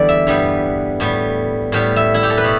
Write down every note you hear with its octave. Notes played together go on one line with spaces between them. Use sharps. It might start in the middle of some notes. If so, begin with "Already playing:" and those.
Already playing: E2 D3 G3 B3 D5
E5
G2 G3 B3
A2 G3 B3
A2 G3 B3
E5
E4
G4
A4
B4
B2